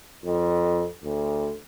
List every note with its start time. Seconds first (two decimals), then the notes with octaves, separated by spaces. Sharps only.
0.24 F2
1.03 D2